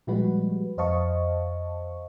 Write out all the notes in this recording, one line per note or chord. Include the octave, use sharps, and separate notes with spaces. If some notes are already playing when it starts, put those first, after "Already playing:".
A#2 F3 G3 G#3 F#4 B4
F2 C5 D#5 F5 A5 C#6